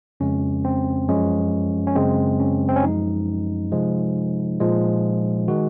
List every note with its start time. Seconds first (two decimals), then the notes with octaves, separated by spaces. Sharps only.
0.20 F2 C#3 G#3 C#4
0.65 C4
1.08 F#2 F3 G#3 C#4
1.87 C#4
1.95 F#2 C#3 G#3 C4
2.40 C#4
2.69 C4
2.76 C#4
2.83 F#2 F3 G#3 D#4
3.72 C3 F3 G#3
4.60 A#2 F3 G#3
5.48 D#3 G#3 F#4